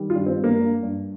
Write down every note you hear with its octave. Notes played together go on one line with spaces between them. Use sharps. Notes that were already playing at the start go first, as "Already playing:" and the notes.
Already playing: D#3 G3
F4
G2
C4
G2
A#3
G2
G2